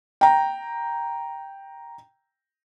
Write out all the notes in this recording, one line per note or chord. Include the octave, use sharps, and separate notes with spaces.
G5 A#5